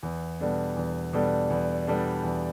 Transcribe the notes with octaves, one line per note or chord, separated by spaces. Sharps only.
E2
B2 G3 D4 A4
E2
B2 G3 D4 A4
E2
B2 G3 D4 A4
E2